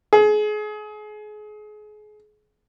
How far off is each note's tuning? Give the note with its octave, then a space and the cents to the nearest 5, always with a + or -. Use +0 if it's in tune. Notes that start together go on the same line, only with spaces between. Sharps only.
G#4 +30